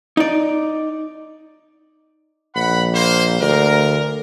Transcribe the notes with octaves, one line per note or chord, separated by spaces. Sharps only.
D#4 D5
A#1 F#5 B5
A#3 C5
D2 A#4